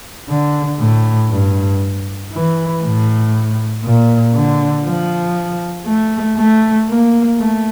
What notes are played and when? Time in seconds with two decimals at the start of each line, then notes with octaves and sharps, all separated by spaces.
0.30 D3
0.80 A2
1.31 G2
2.33 E3
2.84 A2
3.84 A#2
4.35 D3
4.85 F3
5.87 A3
6.38 A3
6.89 A#3
7.39 A3